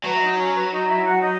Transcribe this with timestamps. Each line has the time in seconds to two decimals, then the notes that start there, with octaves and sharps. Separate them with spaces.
0.04 F#3 B4
0.15 E5
0.21 D#4 D#5
0.37 C#4 C#5
0.54 B4
0.71 D#4 D#5
0.87 E4 E5
1.04 F#4 F#5
1.21 D#4 D#5